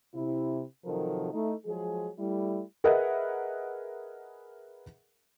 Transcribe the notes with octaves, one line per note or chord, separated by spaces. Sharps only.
C3 E4
C3 D#3 F3 F#3 A4 A#4
A3 D#4 E4
F3 F#3 G#3 G#4
G3 A3 E4
G#4 A#4 B4 D#5 E5 F#5